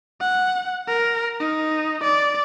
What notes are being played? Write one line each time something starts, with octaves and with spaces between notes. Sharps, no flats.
F#5
A#4
D#4
D5